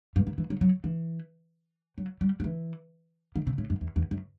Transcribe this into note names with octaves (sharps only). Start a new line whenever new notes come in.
G2
D#3
E3
F#3
F#3
E3
F#3
G3
F#3
E3
D#3
C3
A2
F#2
E2
E2
F#2